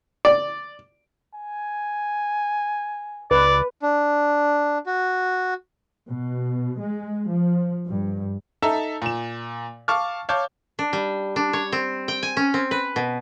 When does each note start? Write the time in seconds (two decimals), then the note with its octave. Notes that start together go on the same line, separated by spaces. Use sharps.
0.25 D5
1.34 G#5
3.31 C#2 B4 D5
3.82 D4
4.87 F#4
6.08 B2
6.80 G#3
7.28 F3
7.87 G2
8.62 D#4 A4 E5 A5 A#5
9.02 A#2 E7
9.88 F5 A5 C#6 D6 F6
10.29 C#5 F5 A5 D6 G6
10.79 D4
10.93 G3
11.36 D4
11.53 C#5
11.72 C4
12.08 G5
12.23 G#5
12.37 C#4
12.54 C4
12.71 B4
12.96 B2